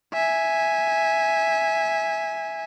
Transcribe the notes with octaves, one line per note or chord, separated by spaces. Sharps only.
E5 G#5